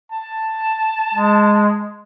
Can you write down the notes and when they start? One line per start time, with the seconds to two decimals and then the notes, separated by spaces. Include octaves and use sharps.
0.12 A5
1.15 G#3